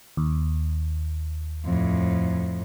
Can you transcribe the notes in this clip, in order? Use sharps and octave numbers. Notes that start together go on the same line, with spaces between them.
D#2
F2 A2